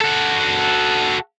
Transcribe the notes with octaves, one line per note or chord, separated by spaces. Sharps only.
F#4 A4